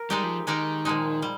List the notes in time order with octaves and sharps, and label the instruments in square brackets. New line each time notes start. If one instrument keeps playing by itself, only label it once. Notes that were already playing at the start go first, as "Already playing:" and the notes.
Already playing: [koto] A#4
[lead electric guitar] G3 [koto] G#3 D#4 G4
[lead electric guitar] F3
[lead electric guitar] D#3 [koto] G#3 D#4 G4 A#4
[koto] A#2 F3 G#3 D#4
G3